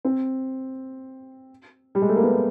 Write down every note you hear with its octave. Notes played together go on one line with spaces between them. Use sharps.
C4
G3
G#3
A3
A#3
B3